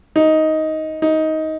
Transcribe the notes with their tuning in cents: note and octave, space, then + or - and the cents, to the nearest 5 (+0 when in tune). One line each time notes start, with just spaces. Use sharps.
D#4 +10
D#4 +15